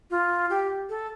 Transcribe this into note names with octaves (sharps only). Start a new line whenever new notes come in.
F4
G4
A4